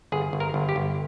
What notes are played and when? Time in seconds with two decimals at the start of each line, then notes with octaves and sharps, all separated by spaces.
0.12 G1 G#4
0.33 G1
0.40 A#4
0.54 G1
0.69 G4
0.76 G1